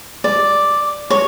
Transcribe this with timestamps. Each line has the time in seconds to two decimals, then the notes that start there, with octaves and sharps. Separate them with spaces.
0.24 D5
1.10 C#5